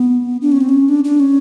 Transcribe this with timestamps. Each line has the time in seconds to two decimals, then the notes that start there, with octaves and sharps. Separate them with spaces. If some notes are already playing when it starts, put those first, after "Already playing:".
Already playing: B3
0.42 D4
0.52 C#4
0.61 C4
0.69 C#4
0.89 D4
1.04 D4
1.20 C#4